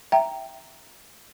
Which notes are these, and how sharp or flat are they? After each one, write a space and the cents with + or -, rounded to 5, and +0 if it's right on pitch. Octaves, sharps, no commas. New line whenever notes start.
E5 +0 G5 -5 A#5 +0